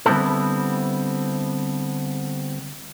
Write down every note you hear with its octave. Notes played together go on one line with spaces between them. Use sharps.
D3 G3 B3 C4 E4 A4